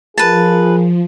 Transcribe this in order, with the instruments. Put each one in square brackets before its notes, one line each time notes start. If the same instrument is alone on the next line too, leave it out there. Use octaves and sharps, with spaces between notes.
[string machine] F3 [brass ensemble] F4 G#4 A#4 [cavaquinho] B4 A5